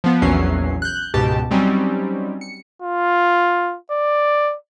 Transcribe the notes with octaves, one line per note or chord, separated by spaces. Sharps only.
F3 B3
A#1 E2 E3 F#3 C#4 C7
F#6 G6
C#2 G#2 B2 G4 A5
F#3 G3 C4 C#4 D#4
C#7
F4
D5